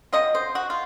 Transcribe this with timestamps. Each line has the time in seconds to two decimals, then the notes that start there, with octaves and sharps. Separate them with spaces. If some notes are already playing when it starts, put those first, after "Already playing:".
0.13 F#3 C4 F4 D#5
0.35 C5
0.55 F#4
0.70 F4